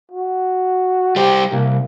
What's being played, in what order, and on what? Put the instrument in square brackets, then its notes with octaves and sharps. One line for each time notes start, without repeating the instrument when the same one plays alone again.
[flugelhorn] F#4
[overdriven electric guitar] G3 C5 [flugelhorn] G4
[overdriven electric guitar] C2 [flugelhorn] A#3